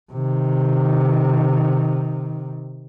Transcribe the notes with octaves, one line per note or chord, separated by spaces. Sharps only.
C3 D#3